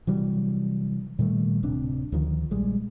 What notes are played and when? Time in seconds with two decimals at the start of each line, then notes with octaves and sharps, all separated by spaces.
0.07 C3 E3 F#3 G3
1.19 A#2 D#3 G3 A3
1.63 D1 C3 C4 D4
2.12 D2 D#3 F3
2.51 A#1 G3 G#3